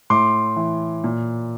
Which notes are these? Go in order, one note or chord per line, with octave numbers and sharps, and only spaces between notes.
A2 C6 D6
E3
A#2